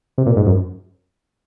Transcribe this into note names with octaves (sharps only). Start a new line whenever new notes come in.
C3
A#2
G#2
F#2